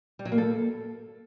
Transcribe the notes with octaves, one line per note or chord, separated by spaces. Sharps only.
G3
F#3
A#3
A4